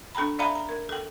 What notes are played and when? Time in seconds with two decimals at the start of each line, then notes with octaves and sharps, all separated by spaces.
0.15 D4 A4 G5 A#5 B5
0.39 D5 E5 F5 G5 A#5 B5
0.55 A#5
0.69 A#4
0.89 A4 G5